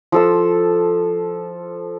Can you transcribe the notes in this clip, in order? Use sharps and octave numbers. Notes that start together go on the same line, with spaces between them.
F3 A4 E6